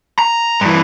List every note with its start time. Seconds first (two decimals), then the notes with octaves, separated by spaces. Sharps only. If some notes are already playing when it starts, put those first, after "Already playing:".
0.19 A#5
0.61 G2 E3